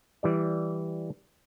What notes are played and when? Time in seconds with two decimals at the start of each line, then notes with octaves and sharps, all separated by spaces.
0.23 E3 G3 D5